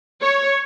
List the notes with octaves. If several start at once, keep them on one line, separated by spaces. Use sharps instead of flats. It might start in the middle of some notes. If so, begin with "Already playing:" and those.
C#5